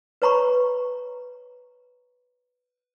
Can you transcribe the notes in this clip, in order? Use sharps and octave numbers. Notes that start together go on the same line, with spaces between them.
B4 C#5 A#5 B5 C#6